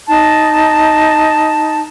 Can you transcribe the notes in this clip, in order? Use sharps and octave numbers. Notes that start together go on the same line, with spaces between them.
D#4 A5